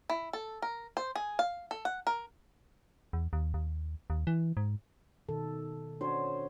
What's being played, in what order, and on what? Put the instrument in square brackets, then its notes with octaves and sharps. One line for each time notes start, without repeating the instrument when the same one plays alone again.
[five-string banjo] E4
A4
A#4
C5
G#4
F5
A4
F#5
A#4
[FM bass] E2
D#2
D#2
D#2
E3
G#2
[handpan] B2 D#3 A4
[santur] C#4 C5 [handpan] D4 F#4 C#5